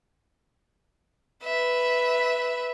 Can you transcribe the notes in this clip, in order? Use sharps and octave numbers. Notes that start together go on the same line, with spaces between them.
B4 E5